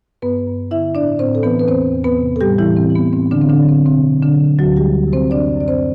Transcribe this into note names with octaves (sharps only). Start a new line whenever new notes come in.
G2 B3 B4
G2
D3 E4 E5
A2 D4 D5
A2 C4 C5
A4
E3 B3 B4
B4
E2 C4 C5
E2
B3 B4
C3
A4
A2 G3 G4
E3 E4
A2
C4
E3
B3
A2 C4
D3 D4
A2 C4
D3 D4
F#3
C4
B2 C4
B2
D3 D4
F#3
D2 F#3 F#4
G3 G4
A3
C3
C4 C5
F#2 D4 D5
F#2
D5
C4 C5